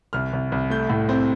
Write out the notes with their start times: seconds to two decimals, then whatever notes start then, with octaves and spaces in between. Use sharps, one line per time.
0.13 C2 F6
0.33 C2
0.52 C2
0.70 A3 G6
0.90 A2
1.09 C4